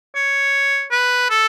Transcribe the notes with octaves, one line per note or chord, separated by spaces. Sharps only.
C#5
B4
A4